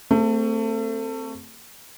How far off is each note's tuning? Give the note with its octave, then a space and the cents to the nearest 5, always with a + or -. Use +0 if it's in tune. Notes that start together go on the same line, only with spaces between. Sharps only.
A3 +30 C4 +0 G#4 +0